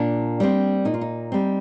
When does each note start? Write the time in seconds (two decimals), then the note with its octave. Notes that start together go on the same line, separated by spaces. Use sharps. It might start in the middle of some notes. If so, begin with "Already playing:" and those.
Already playing: A#2 D4
0.40 G3 C4
0.85 A#2 D#4
0.94 F4
1.01 D#4
1.32 G3 C4